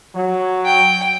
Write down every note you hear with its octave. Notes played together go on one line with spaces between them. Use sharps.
F#3
G5